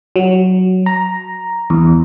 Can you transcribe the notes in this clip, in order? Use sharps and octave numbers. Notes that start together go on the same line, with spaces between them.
F#3
A#5
E2